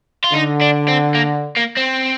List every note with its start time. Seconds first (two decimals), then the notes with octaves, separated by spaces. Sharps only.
0.24 F4
0.33 D3 D#4
0.61 D4
0.88 C4
1.15 A#3
1.57 A#3
1.77 C4